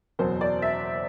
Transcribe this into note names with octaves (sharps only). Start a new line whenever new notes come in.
F#1 E2 B2 F#3 C5
D5
E5